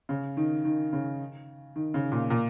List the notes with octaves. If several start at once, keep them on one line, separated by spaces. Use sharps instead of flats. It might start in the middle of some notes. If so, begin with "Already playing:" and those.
C#3
D#3
D#3
C#3
D#3
C#3
A#2
A#2